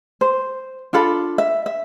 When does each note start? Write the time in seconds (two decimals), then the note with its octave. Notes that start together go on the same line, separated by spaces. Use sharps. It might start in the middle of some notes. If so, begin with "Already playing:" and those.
0.21 C5
0.93 D4 F4 A4 B5
1.38 E5
1.66 E5